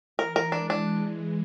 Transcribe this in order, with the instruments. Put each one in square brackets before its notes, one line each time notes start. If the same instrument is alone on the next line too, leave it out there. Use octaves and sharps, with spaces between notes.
[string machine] E3 [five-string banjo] A#4
[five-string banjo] A#4
[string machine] G#3 [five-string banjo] D4
[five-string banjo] D4